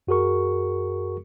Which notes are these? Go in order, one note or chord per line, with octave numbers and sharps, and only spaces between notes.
F#2 F#4 G#4 A#4 C#6